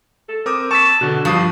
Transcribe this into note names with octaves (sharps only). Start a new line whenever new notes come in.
A4
C4 A#4 D6 D#6
A5 C#6 E6 B6
B2 D3 F#4
G2 F3 D#6 C7